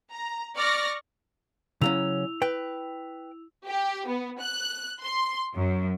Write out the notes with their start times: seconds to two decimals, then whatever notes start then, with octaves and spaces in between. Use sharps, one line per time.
0.11 A#5
0.56 D5 C#6 F6 A#6
1.81 C#3 F#3 C#4 E4 E6 F7
2.42 B4 G5
3.66 G4
4.08 B3
4.41 F#6
5.01 C6
5.56 F#2